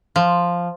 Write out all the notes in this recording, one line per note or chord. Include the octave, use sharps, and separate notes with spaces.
F3